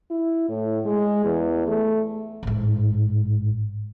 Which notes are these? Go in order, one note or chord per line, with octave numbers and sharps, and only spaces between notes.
E4
A2
G#3
E2
A3
A1 G#2